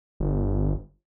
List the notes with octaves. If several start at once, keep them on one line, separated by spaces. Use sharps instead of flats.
G1